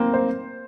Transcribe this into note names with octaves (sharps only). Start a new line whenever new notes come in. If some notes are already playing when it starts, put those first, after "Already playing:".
Already playing: A#3 C4
C5